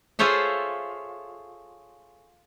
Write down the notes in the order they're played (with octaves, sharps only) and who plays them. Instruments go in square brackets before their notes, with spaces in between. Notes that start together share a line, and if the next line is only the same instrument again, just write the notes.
[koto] F4 G#4 A4 C5 C#5 E5